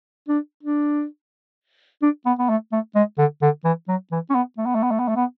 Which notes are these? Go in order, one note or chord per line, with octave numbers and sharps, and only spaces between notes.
D4
D4
D4
B3
B3
A3
A3
G#3
D3
D3
E3
F#3
E3
C#4
B3
A3
B3
A3
B3
A3
B3
A3
B3